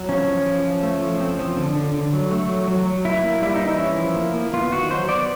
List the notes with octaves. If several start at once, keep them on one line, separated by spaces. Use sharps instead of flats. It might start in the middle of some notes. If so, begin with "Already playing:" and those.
Already playing: F#3
F3 C#4
F3
F3
F3
A3
F3
C4
F3
D3
D3
D3
F#3
A3
F#3
F#3
F#3
A#3 E4
A#3
G3 E4
D#4
E3
E4
C#4
F3
A#3
A#3
B3 F4
D#3 F#4
F#3 C5
B3 D5